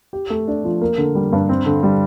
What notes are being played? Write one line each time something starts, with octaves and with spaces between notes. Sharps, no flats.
G4
A3
D4
F3
A#3
D3
G3
G2
C4
D3
G3